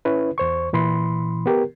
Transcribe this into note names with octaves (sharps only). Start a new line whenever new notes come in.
C#4 E4 B4
E2 C5 C#6
A#2 E3 B5 C6
B3 G4 A#4